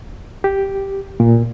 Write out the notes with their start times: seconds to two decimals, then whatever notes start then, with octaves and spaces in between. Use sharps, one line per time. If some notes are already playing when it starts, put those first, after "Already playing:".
0.44 G4
1.20 A#2